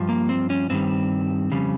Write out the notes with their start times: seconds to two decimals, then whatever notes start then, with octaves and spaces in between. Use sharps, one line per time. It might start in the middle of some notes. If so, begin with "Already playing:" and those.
Already playing: G2 F3
0.09 A#3
0.29 C4
0.50 C#4
0.70 G2 D#3 G3 C4
1.52 F2 C#3 G3